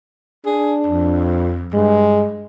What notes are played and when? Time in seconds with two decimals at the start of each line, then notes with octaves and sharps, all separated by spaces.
0.46 D4 G#4
0.86 F2
1.74 G2 G#3